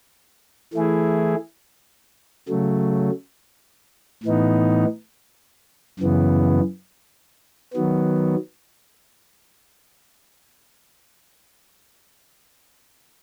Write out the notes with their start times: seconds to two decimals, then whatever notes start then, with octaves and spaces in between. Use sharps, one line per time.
0.73 E3 A3 E4 G#4
2.48 C#3 F#3 A3
4.23 A2 E3 B3 D#4
5.99 F#2 C#3 E3 B3
7.74 D#3 F#3 B3